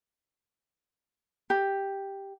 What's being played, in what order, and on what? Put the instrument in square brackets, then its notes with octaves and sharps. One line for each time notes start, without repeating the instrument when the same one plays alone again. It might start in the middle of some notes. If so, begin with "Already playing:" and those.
[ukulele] G4